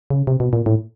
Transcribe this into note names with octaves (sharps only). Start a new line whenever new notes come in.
C#3
C3
B2
A#2
A2